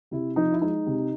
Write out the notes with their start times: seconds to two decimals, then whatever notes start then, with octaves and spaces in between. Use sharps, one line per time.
0.11 C3 E4
0.36 F3 D#4
0.52 E4
0.61 G#3 D#4
0.86 C3